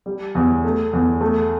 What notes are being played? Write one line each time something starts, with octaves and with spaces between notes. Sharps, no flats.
G3
E2
A3
E2
A3